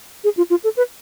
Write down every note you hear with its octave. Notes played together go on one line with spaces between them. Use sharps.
G#4
F4
F4
A4
B4